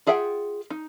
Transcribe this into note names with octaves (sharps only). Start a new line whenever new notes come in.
F4 G#4 E5 F#5 G5
D#4